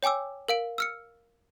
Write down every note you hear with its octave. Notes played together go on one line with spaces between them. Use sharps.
C#5 G5 G#5 D6 E6
A#4 F5 D7
E6 F6 C#7